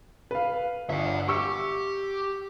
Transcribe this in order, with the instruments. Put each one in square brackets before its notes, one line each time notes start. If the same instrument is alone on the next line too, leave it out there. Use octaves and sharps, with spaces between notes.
[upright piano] B4 F5
[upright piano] G1 [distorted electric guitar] E5 F#5
[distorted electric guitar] G4 [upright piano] C#6 E6 C#7